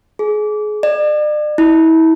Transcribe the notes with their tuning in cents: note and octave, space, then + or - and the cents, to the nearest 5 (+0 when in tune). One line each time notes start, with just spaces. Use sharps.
G#4 +30
D5 +40
E4 -35